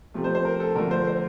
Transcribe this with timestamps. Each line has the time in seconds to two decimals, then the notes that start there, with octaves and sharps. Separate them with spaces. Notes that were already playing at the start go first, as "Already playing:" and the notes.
0.14 C3 F3 A3
0.24 C5
0.35 C5
0.45 A#4
0.60 A4
0.75 D3 F3 A3 A#4
0.91 C5
1.07 C5